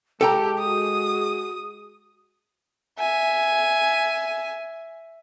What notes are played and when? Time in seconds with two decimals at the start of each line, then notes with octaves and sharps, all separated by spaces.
0.21 G#3 G4 A4 G5 A5 A#5
0.60 F#4 G#4 D#6
2.99 E5 G#5